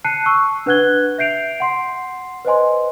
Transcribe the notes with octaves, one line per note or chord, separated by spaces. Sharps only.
A5 F#6 C7 C#7 D#7
A5 C#6 E6
D4 B4 F#5 F#6 G#6 G7
E5 G6 C7 D7 F7
F#5 C6 C7
B4 C5 D#5 G#5 C6